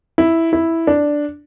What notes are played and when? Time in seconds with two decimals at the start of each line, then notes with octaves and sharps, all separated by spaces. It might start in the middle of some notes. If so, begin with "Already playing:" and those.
0.18 E4
0.53 E4
0.87 D4